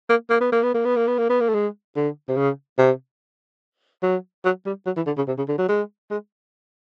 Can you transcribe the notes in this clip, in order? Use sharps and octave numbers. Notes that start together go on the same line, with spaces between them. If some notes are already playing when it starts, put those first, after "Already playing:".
A#3
A#3
B3
A#3
B3
A#3
B3
A#3
B3
A#3
B3
A#3
A3
G#3
D3
C3
C#3
C3
F#3
F#3
G3
F#3
E3
D3
C#3
C3
C#3
D3
F#3
G#3
G#3